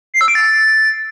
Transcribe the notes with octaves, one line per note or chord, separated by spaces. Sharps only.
C7
E6
D7
A6